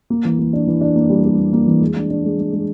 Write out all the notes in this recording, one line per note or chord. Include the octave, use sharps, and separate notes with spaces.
A#3
E3
A#3
D4
E3
D4
A#3
G3
G3
A#3
A#3
E3
G#3
D4
D4
G#3
G#3
G#3